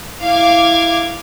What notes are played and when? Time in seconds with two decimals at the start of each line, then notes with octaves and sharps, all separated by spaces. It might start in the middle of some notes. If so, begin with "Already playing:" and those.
0.22 E4 F5 D6 G#6